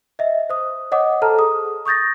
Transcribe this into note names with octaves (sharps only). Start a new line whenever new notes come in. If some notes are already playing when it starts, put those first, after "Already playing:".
D#5 E5
C5 D#6
C#5 D#5 F#5 D6 D#6
A4 C5 A5 A#5 F6
G#4 D#6
C#6 D#6 G6 A6 A#6